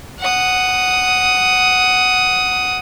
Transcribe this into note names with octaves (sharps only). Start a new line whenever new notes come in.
F#5 D#6